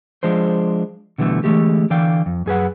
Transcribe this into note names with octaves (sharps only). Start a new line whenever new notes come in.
F3 G#3 D4 C5
B2 D3 E3 G3 A3
D3 E3 G#3 A3 G4
D3 E3 D5 F5 G5
F2
F#2 G#4 B4 F#5